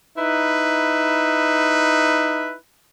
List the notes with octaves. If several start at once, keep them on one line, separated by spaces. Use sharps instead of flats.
D#4 E4 B4